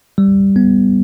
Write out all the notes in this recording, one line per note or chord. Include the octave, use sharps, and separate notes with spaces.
G3
B3